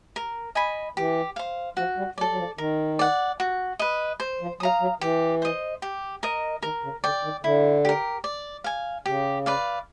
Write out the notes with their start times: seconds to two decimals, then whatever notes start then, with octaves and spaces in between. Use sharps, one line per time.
0.16 A#4
0.55 D#5 G#5 B5
0.97 E3 G4
1.36 C5 F5
1.77 F3 F#4
1.97 G3
2.18 F#3 D5
2.21 A4
2.31 F#3
2.38 F3
2.58 D#3 A#4
2.99 D5 F#5
3.40 F#4
3.79 B4 D#5
4.20 C5
4.41 F3
4.60 F#3 F5 A#5 D#6
4.81 F#3
5.01 E3 G4
5.42 C5 D#5
5.82 G4
6.23 A#4 D#5
6.62 D#3 A#4
6.83 C#3
7.03 D3 D5 G5
7.23 D#3
7.43 D3 E4
7.85 G4 A#4
8.24 D5
8.64 F5 G#5
9.06 C#3 G4
9.46 B4 D5 F5